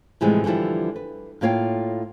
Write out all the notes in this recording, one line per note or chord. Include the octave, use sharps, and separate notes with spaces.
A2 C3 E3 F3 G3 G#3
D3 E3 F3 G3 E4
B4
A2 A#3 F4 C#5 F5 G5